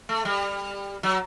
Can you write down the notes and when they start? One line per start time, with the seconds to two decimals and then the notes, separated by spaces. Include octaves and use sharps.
0.09 A3
0.25 G3
1.03 F#3